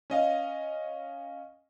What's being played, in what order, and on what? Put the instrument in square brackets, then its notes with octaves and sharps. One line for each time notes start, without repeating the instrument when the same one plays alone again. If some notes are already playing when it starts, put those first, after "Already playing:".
[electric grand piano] C#4 D#5 F5